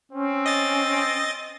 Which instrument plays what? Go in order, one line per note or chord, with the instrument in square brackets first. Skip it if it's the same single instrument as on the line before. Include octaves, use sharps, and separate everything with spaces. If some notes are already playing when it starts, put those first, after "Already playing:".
[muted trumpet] C4 [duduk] C#4
[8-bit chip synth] D#5 A6